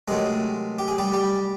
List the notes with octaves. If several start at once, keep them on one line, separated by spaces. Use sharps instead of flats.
C3 D#3 F#3 G#3 A3 G#4
G4
G#4
G3 G4
G3 G4